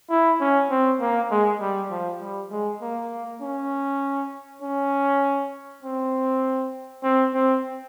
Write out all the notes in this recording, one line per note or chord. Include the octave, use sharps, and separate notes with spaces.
E4
C#4
C4
A#3
G#3
G3
F3
G3
G#3
A#3
C#4
C#4
C4
C4
C4